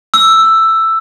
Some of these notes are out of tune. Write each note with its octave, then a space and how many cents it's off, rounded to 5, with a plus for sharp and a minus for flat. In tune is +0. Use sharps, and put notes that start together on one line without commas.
E6 +5